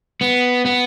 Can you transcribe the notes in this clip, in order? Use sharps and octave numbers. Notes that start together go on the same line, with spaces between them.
B3
B3